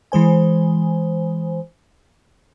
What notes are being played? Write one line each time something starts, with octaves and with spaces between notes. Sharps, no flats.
E3 G#3 C5 G#5